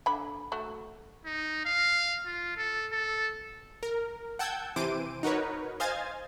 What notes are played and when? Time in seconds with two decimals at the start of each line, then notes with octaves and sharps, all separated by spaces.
0.06 D3 B5
0.52 A3 F#4
1.25 D#4
1.65 F5
2.26 F4
2.57 A4
2.92 A4
3.83 A#4
4.39 F#5 G5 A5 E6 G6 G#6
4.76 C3 E3 C5 D6 D7 D#7
5.23 D#4 F#4 A#4 B4 C#5
5.80 C5 D#5 F5 G#5 G#6 A6